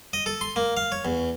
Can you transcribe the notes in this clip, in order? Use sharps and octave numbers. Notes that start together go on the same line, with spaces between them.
D#5
A4
C6
A#3
F5
C#5
E2